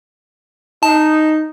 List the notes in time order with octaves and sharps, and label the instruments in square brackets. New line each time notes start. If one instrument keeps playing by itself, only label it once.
[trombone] D#4 [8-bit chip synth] A5